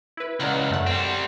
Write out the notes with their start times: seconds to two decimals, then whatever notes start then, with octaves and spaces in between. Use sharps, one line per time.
0.17 E4 B4
0.40 C#2 D5 F#5 A#5
0.70 F#2 A3 F#5
0.87 G3 C4